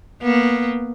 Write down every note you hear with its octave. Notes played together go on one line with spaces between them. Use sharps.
A#3 B3